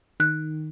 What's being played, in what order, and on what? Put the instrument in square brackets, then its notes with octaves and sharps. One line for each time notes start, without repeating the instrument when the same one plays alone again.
[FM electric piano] D#3 [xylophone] F#6